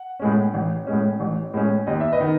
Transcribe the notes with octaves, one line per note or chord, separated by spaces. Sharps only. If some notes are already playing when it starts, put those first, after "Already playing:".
Already playing: F#5
A2 G#3 C#4
A1
A2 G#3 C#4
A1
A2 G#3 C#4
D#2 D#5
E5
B4 D#5
D#3